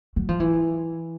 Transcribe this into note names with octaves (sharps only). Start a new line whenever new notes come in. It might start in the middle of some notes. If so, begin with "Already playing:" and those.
F#3
F3
E3